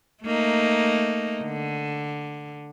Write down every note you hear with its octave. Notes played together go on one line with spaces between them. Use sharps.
A3 A#3 D#4
D3